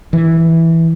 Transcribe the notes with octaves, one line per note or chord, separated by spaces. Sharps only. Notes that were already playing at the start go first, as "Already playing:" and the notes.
E3